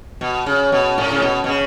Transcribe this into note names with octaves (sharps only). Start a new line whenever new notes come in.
B2
C#3
B2
A2
C#3
B2
B2
C#3